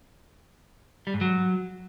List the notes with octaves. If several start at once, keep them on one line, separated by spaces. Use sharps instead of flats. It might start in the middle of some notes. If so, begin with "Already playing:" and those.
G3
G#2
F#3